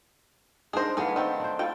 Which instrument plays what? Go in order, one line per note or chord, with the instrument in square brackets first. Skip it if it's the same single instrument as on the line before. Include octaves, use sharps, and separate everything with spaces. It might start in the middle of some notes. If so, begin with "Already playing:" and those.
[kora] D4 D#4 A#4 [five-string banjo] G#4 C5
[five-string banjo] E3 G#4 [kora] A3 B3 F5
[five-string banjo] D#3 C4 [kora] A4
[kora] D4 C5
[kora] E4 F4 A4 [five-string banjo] G5